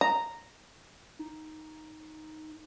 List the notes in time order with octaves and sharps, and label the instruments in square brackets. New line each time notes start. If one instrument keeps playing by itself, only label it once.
[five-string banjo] A#5
[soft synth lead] D#4